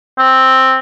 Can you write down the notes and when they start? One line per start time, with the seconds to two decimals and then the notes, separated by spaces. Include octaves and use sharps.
0.18 C4